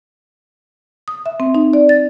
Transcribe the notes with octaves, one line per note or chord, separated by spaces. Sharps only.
D#6
E5
C4
D#4
D5
A6